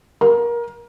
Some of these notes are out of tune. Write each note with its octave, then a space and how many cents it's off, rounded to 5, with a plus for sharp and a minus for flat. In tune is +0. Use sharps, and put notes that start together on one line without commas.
A#4 +20